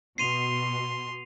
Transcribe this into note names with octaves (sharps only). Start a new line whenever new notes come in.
B2 C6 C7 D#7 F7